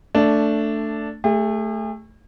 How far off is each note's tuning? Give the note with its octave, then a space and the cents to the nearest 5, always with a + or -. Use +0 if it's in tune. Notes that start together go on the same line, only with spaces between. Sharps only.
A3 +10 D4 -5
A3 +0 G#4 -45